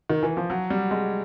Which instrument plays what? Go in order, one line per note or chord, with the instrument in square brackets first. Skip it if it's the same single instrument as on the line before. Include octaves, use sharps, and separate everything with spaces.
[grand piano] D#3
E3
F3
F#3
G3
G#3